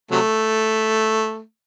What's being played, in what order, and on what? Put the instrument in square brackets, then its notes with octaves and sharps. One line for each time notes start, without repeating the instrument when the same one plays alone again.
[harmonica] C3 F#3 A3